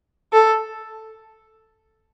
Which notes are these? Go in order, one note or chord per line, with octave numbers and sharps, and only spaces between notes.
A4